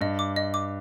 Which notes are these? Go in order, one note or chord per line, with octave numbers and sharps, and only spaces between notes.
G2 D#5
D6
D#5
D6